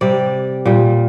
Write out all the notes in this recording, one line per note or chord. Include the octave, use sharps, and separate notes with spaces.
C3 G3 D5
A#2 G3